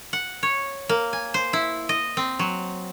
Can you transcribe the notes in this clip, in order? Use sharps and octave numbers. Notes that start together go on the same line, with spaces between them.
F#5
C#5
A#3
G#5
C5
E4
D#5
C4
F#3